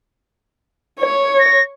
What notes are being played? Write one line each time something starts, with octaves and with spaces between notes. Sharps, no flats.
C#5
A#6